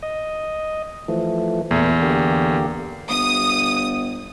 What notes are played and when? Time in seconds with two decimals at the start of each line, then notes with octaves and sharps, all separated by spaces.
0.02 D#5
1.08 E3 F3 A3
1.71 E2 A#2 E3 A3
2.02 D3 A#3 G4
3.10 G1 D#6